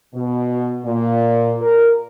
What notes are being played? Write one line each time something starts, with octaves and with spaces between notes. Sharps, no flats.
B2
A#2
A#4